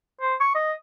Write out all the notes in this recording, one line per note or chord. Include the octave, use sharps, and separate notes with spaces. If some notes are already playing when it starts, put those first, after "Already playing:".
C5
C#6
D#5